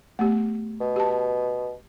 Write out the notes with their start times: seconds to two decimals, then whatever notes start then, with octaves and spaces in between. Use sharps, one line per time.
0.19 A3 B3 G4
0.80 B2
0.96 G4 A5